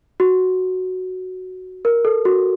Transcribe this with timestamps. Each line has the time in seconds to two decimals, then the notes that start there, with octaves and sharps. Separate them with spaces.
0.20 F#4
1.85 A#4
2.05 A4
2.25 F#4